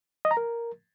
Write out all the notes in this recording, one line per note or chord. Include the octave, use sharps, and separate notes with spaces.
D#5
A#5
A#4